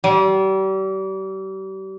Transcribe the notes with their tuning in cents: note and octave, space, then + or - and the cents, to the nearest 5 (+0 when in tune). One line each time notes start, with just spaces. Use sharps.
G3 -35